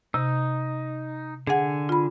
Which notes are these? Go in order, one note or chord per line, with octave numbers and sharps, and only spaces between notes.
C3 D#4
D3 G#4 F#5 G#5
F4 B5